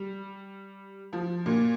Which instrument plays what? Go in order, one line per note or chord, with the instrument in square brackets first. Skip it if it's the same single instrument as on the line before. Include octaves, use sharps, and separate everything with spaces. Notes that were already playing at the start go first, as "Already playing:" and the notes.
Already playing: [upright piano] G3
F3
A#2